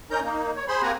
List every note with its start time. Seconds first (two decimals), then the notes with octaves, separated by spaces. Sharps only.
0.11 C#4 D#4 A#4 A#5 G6
0.23 A#3 D#4
0.56 C#5
0.68 G#4 C5 B5 C6
0.82 A#3 C4 G4 F#5 G#5 A#5